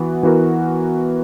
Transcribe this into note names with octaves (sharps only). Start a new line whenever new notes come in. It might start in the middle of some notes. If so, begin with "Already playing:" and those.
Already playing: E3 B3 F#4
E3 B3 F#4 A#4